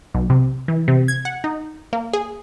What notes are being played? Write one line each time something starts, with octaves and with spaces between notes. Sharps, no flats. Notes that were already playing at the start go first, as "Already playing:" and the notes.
B1
C3
E3
C3
G#6
F#5
D#4
A#3
G#4